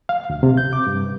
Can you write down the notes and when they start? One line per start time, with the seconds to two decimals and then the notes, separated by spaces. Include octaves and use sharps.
0.09 F5
0.30 D2
0.43 C3
0.57 G6
0.73 D6
0.87 G2